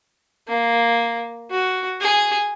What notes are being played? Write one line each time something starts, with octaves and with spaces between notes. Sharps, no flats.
A#3
F#4
G#4